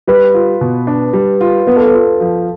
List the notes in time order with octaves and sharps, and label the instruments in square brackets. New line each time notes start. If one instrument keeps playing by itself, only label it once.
[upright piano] G3 [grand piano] B4
[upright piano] F4
B2
D4
G3
F4
[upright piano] B3 [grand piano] B4
[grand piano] A4
B4
[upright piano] F4
F3